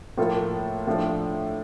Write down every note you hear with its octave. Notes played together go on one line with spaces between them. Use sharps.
A2 F3 A#3 F4 A4
A2 F3 A3 D4